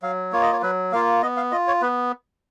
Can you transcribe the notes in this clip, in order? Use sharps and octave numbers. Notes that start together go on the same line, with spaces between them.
F#3 F5
A#3 F4 C#5
D#5
C#5
F#3 B4
A#3 F4 F5
B3 D#5
F5
F4 D#5
C#5
B3 B4